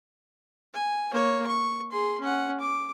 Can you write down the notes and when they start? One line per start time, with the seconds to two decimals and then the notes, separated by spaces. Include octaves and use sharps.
0.74 G#5
1.12 A#3 C#5
1.47 C#6
1.92 G#4 C6
2.21 C#4 F#5
2.60 D6